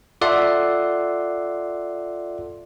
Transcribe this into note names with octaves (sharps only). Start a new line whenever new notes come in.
F4 A4 D5 E5 F#5 C6